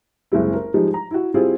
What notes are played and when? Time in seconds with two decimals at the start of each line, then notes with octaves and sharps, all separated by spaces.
0.32 F#1 C2 G#3 E4
0.53 A#4
0.74 F3 G3 G#3 D#4
0.94 A#5
1.11 E4 F#4
1.34 G3 C4 E4 F4 G#4